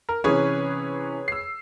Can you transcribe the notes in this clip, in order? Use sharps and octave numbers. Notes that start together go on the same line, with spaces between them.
A#4
C3 E3 C#4 G#4 B4 C#5
E6 C7